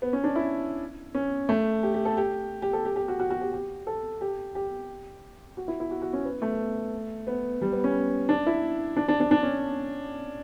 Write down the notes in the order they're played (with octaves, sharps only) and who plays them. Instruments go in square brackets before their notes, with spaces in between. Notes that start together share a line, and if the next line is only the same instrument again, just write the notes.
[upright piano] B3
C#4
D4
E4
C#4
A3
G4
G4
A4
G4
G4
A4
G4
G4
F#4
F#4
F#4
G4
G4
A4
G4
G4
F#4
E4
E4
F#4
F#4
C#4
B3
A3
B3
G3
B3
C#4
D4
E4
D4
D4
D4
D4
C#4